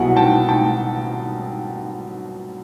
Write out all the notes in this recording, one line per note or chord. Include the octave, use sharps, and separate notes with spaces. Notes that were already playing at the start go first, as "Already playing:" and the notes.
Already playing: C2 B2 F#3 F#5 G#5
G5 A5
G5 A5